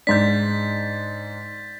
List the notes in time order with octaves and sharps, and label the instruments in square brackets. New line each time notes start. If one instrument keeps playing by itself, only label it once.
[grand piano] G#2 D4 [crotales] G6 A6 B6